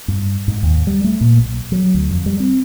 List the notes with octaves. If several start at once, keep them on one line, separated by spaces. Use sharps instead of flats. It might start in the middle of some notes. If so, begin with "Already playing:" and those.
G2
G#2
D#2
G3
A3
A#2
B1
F#3
D2
F2
G3
C4